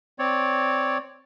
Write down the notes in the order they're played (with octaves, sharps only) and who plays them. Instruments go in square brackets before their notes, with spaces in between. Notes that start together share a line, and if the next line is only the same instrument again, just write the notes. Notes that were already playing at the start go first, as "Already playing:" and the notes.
[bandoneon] C4 C#5 D5